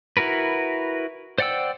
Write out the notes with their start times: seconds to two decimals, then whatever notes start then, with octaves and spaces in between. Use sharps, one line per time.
0.17 E4 F#4 A#4 B4
1.38 C5 D5 F#5 G5 E6